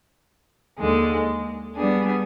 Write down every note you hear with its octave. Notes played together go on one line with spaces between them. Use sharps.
D#2 D3 G#3
G3 B3 D4 G#4